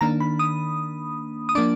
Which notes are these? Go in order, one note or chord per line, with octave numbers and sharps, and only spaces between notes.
D#3 A#3 D4 A#5
B5
D#6
D#6
F3 A#3 D4 D6